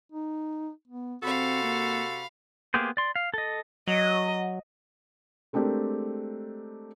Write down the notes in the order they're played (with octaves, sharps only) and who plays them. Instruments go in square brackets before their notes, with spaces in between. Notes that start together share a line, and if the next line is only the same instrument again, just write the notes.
[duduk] D#4
B3
[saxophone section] C3 F#4 A4 [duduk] C4 [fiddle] F5 B5
[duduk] A#3
[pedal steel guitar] A#3 B3 G4 G#4 C5
D5 C6
F5
A4 D#5
[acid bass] F#3 [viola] D#5
[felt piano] G#3 A3 C4 D4 G4 A#4